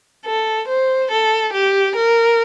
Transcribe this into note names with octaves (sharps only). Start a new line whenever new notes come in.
A4
C5
A4
G4
A#4